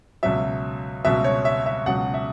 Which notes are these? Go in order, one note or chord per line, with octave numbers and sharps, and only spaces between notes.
C#2 B2 F#3 E5
C#2 B2 F#3 E5
C#5
E5
E5
C#2 B2 F#3 F#5
E5